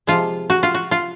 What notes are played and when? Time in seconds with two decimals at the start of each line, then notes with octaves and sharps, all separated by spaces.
0.07 C3 F3 G#3 F4
0.50 F#4
0.63 F4
0.74 F#4
0.91 F4